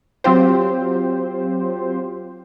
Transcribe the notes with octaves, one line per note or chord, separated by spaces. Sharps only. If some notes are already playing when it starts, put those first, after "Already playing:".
F#3 C4 F4 G4 C5